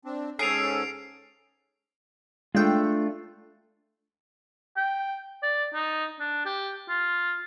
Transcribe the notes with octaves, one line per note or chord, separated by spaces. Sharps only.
C4 D4
G#2 C#4 G#4 A4 C7 D7 F7
G#3 A3 D4 F4 G5
G5
D5
D#4
D4
G4
F4